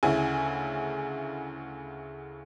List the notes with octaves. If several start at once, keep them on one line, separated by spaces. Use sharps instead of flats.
D2 C#3 E4 G#5